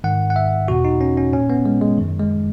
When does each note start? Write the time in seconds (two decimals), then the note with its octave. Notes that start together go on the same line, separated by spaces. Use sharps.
0.04 G#2 D#3 F#5
0.30 F#5
0.36 E5
0.68 E2 B2 F#4
0.85 D#4
1.01 C#4
1.17 C#4
1.33 A#2 C#4
1.50 B3
1.65 G#3
1.81 G#3
1.98 F#2 D#3
2.19 G#3